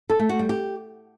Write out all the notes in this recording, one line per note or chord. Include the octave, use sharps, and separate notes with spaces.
A4
A3
F#4
G3
G4